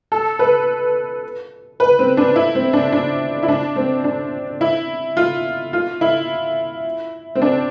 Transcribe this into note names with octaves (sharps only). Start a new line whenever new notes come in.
A4
B4
B4
C4
D4
E4
C4
D4
D4
E4
D4
C4
D4
E4
F4
F4
E4
C4
D4